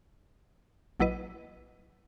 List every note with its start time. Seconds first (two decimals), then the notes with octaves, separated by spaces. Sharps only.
1.00 A#1 F#3 E4 B4 D#5